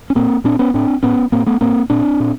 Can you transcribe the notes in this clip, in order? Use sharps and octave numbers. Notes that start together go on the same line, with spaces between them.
C#4
A#2 A#3 C4
A#2 C4 D4
B3 C#4
A2 C4 D4
A2 B3 C#4
A2 A#3 C4
A3 B3
A2 A#3 C4
A#2 C4 D4
A#2